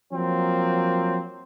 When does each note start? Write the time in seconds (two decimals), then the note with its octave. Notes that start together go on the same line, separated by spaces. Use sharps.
0.13 F3 F#3 A#3 C4